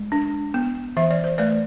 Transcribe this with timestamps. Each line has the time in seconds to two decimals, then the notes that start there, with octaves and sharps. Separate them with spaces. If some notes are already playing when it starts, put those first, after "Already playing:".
Already playing: G#3
0.12 D4
0.54 B3
0.97 E3 E5
1.11 D5
1.24 C5
1.38 A3 B4 D5